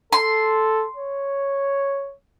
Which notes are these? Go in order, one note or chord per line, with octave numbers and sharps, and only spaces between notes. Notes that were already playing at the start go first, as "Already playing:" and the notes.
A4 C6
C#5